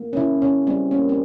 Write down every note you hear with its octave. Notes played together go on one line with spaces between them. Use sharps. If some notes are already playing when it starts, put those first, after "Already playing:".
Already playing: A#3
C#4
C#3 E4
C#3 C#4
G3 C4
A#3 C#4
C4